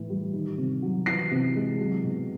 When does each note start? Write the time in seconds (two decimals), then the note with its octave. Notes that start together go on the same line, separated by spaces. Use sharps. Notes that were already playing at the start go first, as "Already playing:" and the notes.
Already playing: A2 E3
0.10 G3
0.33 D#3
0.57 C3
0.82 F#3
1.06 E3 C7
1.31 C3
1.55 G#3
1.80 F#3
2.04 B2